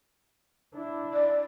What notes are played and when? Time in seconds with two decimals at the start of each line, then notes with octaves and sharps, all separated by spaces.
0.74 D4 E4
1.14 D5